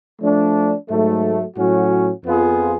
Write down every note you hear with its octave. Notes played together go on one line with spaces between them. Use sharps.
F3 A3 D4
G#2 F#3 A3
A2 F#3 C#4 F#4
F2 F3 B3 F4 G#4